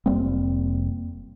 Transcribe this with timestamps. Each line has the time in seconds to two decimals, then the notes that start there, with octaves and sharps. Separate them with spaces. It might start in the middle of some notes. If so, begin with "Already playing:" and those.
0.06 F1 G3 A#3 C4